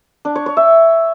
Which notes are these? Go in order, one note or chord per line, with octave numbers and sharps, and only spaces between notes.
D4
C#5
C#5
E5